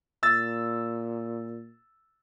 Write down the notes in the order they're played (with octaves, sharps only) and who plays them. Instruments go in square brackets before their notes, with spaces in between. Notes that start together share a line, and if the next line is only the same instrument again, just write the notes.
[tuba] A#2 [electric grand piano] E6 A6